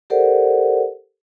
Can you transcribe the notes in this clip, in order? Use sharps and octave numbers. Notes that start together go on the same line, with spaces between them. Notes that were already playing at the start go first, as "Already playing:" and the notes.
G4 A4 A#4 C5 D5 F#5